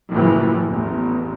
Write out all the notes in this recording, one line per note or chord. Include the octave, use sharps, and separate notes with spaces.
F#1 A2 E3 F3
A1 E2